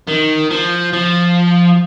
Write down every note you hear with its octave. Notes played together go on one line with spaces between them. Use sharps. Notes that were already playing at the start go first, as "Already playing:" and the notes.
D#3
F3
F3